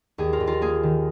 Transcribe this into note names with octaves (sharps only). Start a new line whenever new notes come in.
D#2 G#4
F4 A#4
D#2
F4 A#4
A#3 G#4
D#3